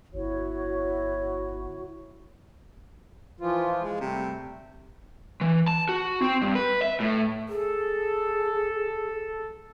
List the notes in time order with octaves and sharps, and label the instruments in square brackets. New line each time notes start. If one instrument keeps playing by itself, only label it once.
[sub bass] G1 [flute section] E4 F#4 C#5
[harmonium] E3 F3 F4
[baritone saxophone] G#3
[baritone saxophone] C3 [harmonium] G3 A3
[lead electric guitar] E3
A5
F#4
C4
G2
B4
E5
A2
[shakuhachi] G#4 [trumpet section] A4